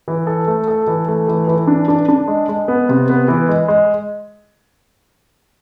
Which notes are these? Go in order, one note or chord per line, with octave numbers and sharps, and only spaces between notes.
E3
A4
A3
A4
E3
A3
E3
E3
D4
D4
D4
G#3
G#3
B3
C3
B3
E3
G#3
G#3